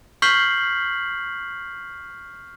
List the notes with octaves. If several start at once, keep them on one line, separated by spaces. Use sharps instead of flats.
C#6 F6 G6 B6 C7 F#7